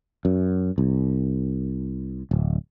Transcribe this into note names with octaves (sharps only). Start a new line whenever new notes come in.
F#2
C2
D1